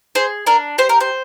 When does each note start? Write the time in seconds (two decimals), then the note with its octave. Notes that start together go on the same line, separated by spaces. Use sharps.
0.15 G#4 C5
0.47 D4 A#4
0.78 G4 C5
0.89 A#4
1.01 C5